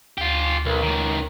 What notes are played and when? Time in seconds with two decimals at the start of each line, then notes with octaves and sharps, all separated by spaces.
0.18 D2 F4 G4
0.65 B1 A#4
0.82 C#2 D#3